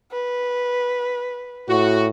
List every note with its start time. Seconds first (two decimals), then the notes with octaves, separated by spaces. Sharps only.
0.12 B4
1.69 A2 F#4